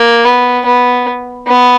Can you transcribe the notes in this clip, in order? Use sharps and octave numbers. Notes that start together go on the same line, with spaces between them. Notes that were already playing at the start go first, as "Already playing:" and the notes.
Already playing: A#3
B3
B3
B3